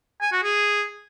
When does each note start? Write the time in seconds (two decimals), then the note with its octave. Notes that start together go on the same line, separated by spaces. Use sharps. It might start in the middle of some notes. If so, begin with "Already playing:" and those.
0.22 G#5
0.32 F#4
0.43 G#4